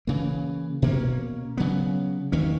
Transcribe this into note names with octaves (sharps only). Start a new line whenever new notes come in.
C#3 E3 A#3
B2 A#3 C#4
C#3 F#3 B3
E2 D#3 A#3 C#4